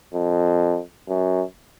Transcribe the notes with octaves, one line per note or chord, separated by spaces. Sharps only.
F2
F#2